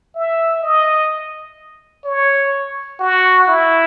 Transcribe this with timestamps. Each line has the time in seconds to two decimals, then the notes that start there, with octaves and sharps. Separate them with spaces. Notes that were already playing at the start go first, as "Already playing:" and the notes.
0.15 E5
0.63 D#5
2.04 C#5
3.00 F#4
3.48 E4